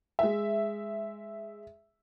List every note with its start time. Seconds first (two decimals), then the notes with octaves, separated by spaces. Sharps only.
0.19 G#3 E5